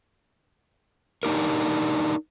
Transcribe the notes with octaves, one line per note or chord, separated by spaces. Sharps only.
D4 D#4 G4 A#4